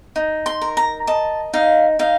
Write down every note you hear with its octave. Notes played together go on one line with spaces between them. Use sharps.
D#4
C6
A#4
A#5
D#5 A5
D#4 F5
D#4 F5